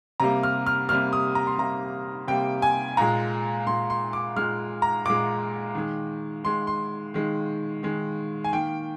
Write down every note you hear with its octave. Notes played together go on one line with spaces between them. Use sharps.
C3 G3 A#3 A#5
F6
F6
C3 G3 A#3 F6
D#6
A#5
C6
C3 G3 A#3 A#5
C3 G3 A#3 G5
G#5
A#2 G#3 A#5
A#2 G#3 C6
C6
D6
A#2 G#3 F6
A#5
A#2 G#3 D6
D#3 G#3
D#3 G#3 C6
C6
D#3 G#3
D#3 G#3
G#5
D#3 A#3 G5